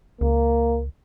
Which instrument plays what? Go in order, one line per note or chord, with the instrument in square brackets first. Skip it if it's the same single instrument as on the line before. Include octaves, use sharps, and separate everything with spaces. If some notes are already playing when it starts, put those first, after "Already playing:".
[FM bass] C#2 [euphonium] A#3